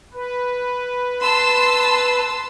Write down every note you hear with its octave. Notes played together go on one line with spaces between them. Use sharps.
B4
A5 C6 E6